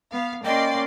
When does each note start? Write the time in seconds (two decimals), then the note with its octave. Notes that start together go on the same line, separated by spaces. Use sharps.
0.13 B3 F5
0.45 A#3 C#4 D5 D#5 G5 C6